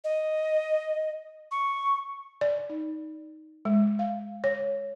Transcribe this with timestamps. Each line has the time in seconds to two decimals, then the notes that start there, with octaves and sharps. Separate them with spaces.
0.04 D#5
1.51 C#6
2.41 D5
2.70 D#4
3.65 G#3
3.99 F5
4.44 C#5